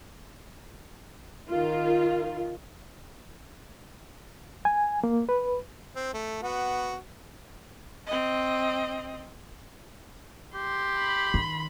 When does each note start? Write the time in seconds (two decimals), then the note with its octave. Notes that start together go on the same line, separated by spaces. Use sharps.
1.49 D#3 F4
4.65 G#5
5.04 A#3
5.29 B4
5.96 C4
6.13 A3
6.43 B3 F#4
8.06 C4 D#5
10.55 G4 C6
10.98 B5
11.34 D#3